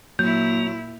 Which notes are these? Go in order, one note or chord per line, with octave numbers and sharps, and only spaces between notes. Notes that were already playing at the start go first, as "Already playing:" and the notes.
A#2 F#3 A#3 E4 G6